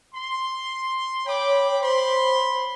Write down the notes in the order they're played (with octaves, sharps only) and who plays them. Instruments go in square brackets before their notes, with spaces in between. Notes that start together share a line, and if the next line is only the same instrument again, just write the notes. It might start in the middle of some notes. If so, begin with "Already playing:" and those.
[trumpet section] C6
[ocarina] C#5 [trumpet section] G5 B5 D6
[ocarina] C5 [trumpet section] B5 C6